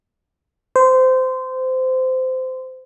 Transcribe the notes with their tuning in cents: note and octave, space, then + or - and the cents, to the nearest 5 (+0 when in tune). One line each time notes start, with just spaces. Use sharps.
C5 -20